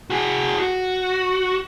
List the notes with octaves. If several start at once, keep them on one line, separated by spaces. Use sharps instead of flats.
F#4 G#4
F#4